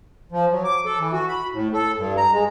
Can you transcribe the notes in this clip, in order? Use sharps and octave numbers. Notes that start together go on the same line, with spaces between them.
F3
F#3
D6
A4
E3
F#4
B5
A2
A4
G2
A#5
G#3